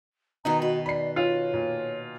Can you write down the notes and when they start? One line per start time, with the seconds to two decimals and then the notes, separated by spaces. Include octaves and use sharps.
0.45 B2 D#3 D#4 B4 A#5
0.62 F#4 B4
0.86 D5 B5 C7
1.16 F4 C#5
1.54 A#2